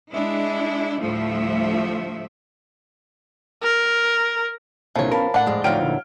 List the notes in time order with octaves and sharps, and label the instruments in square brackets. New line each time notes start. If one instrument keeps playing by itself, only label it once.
[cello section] G#3 D4 E4
D2 A2 F3 G3 A3 E5
[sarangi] A#4
[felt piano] C2 A#2 D3 [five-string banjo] F3 C#5
[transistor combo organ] B3 C#4 [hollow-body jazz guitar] A#4 [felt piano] F5 A5 B5
[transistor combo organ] A2 D5 [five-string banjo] D4 F#5
[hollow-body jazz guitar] F2 G#2 G#3
[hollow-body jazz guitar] D2 F3 D#4 [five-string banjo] F#3 G5 [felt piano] F5 F6 D7
[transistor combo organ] A#2 D3 E4